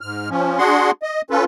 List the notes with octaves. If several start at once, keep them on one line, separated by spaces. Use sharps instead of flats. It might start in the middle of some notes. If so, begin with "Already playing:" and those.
G#2 F6
F3 C#4
D4 F#4 G#4 F#5 C6
D#5
C#4 F4 A4 B4